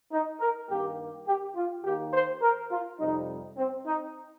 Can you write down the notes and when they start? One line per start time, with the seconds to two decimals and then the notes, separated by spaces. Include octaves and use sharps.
0.12 D#4
0.40 A#4
0.69 G2 D#3 A#3 G4
1.27 G4
1.55 F4
1.84 D#2 D#3 A#3 G4
2.13 C5
2.42 A#4
2.71 F4
2.99 F2 C3 G3 D#4
3.57 C4
3.86 D#4